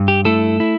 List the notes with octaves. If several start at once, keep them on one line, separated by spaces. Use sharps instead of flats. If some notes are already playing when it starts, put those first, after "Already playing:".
Already playing: G2
G4
A3 E4 A4
E4